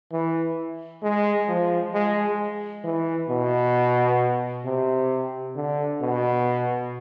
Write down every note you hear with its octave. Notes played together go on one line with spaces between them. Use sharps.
E3
G#3
F3
G#3
E3
B2
C3
D3
B2